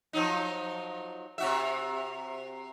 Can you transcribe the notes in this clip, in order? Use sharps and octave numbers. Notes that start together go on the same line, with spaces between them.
F3 F#3 D#4
C3 F#4 E5